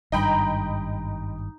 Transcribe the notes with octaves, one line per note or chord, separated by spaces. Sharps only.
G#1 G2 D#4 D#5 G5 B5